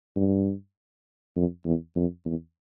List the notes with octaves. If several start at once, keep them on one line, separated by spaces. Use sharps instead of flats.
G2
F2
E2
F2
E2